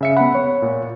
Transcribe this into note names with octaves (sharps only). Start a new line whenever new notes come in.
C#3 E5 C#7
B3 F#5 B5
C#5
A#2